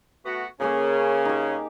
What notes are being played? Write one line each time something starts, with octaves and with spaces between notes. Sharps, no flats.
A3 B3 F#4
C#3 A#3 C#4 G#4 A#4
D#4 G4